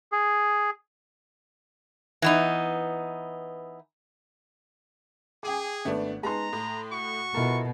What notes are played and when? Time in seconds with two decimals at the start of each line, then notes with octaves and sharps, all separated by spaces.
0.12 G#4
2.22 E3 B3 D#4
5.43 G#4 G5 G#5 D6
5.85 G#1 A3 B3 D4
6.23 G#3 B3 D#4 A5 A#5 C6
6.53 A2
6.92 F#4 C#6
7.34 B2 E4 F4 A4 A#4